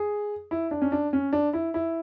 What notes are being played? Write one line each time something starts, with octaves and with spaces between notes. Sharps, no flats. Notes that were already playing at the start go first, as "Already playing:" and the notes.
Already playing: G#4
E4
D4
C#4
D4
C#4
D4
E4
E4